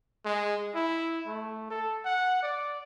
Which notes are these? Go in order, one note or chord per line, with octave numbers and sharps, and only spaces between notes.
G#3
E4
A3
A4
F#5
D5